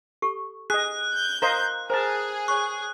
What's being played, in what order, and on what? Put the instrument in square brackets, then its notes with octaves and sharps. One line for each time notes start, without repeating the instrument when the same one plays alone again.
[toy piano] G4 A4 C#6
[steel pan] G#4 D#5 [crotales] F#6
[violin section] G6
[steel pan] A#4 C5 D#5 [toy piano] F5 A#5
[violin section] G#4 [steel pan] A#4 A5 [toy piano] C5
[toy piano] C#5 C#6 [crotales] F#6